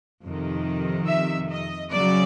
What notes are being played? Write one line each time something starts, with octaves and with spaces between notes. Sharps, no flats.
F2 C3 D#3
E5
D#5
C#3 F#3 D5